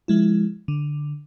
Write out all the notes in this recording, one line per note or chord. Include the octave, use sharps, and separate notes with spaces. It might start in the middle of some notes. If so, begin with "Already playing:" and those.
F3 G#3 E4
D3